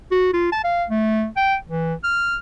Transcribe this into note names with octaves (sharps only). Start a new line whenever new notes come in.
F#4
F4
A5
F5
A3
G5
E3
F6